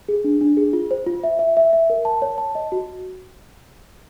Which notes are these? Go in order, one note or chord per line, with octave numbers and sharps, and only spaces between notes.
G#4
D4
D4
G#4
F4
C5
F4
E5
E5
E5
E5
A#4
A5
C#5
A5
D#5
F#4